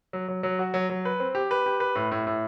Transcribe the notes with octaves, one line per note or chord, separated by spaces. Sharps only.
F#3
F#3
F#3
F#4
F#3
F#3
B4
C4
G4
B4
G4
B4
A2
A2
A2